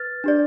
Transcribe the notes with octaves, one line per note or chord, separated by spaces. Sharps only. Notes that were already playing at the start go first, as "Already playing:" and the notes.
Already playing: B4 F6 A6
D4 G4 D5